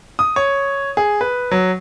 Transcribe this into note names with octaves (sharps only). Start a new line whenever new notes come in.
D#6
C#5
G#4
B4
F#3